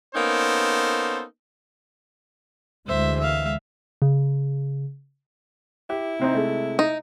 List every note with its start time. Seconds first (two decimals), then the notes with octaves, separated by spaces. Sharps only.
0.16 A#3 B3 C#4 D#4 A4 C5
2.87 D2 E3 G#3 C5 E5
3.20 E5 F5
4.02 C#3
5.90 E4 G4
6.19 C3 C4 D#4
6.34 C3 G#3 A3
6.79 D#4